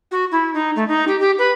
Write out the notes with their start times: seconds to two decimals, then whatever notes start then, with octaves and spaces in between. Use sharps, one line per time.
0.11 F#4
0.31 E4
0.54 D#4
0.76 A3
0.88 D#4
1.07 G4
1.20 G4
1.39 B4